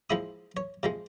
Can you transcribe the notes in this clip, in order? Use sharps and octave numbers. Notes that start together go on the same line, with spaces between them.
F3 G#3 E4 D#6
C#5
C3 F3 G#3